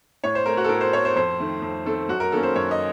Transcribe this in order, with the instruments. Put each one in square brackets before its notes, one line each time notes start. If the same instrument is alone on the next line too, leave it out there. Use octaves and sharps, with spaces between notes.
[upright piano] A2 C#5
C5
A3 C4 A#4
F#4
A4
A2 A#4
C5
A3 C4 C#5
C5
F2 C5
D#3 A3 C4
F2
D#3 A3 C4 A4
F#2 F#4
A#4
D#3 A#3 C#4 A4
C5
F#2 C#5
D#5